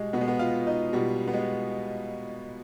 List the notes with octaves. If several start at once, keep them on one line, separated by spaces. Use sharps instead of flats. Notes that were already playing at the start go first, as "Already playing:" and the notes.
Already playing: B2 G3 G#3
B2 B3
G#3
B3
F4
D#4
B2 G3
B3
G#3